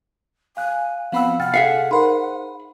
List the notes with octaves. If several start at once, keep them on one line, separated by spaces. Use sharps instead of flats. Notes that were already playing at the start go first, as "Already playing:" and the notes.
F5 G#5 F#6
F3 B3 C4 F5 F#5 B5 E6
C3 F#5 G5 F6 A6
G#4 A4 E5 F5 C#7
D#4 A#4 C5 B5 C6